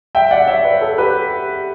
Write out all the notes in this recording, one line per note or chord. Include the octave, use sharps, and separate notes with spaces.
E5 G5
D5 F#5
C#5 E5
B4 D5
A4 C#5
G4 B4